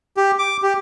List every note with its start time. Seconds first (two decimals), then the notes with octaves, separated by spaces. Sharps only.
0.17 G4
0.39 D6
0.63 G4